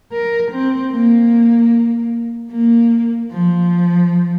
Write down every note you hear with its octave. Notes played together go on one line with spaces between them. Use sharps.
A#4
C4
A#3
A#3
F3